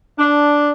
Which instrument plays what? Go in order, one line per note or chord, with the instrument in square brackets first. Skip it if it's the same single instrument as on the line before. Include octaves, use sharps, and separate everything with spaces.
[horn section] D4